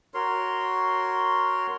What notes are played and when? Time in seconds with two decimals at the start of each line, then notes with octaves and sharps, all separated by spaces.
0.14 F#4 A#4 C#5 C6